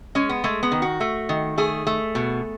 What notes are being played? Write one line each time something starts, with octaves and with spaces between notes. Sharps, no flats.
G#3 C#4
B3
G#3 A3
B3
D#3
F#4
A3
D#3
A3 G#4
A3
B2